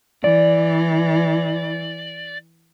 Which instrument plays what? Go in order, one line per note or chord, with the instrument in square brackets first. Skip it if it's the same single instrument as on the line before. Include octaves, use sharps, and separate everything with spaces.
[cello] E3 [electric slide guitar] D5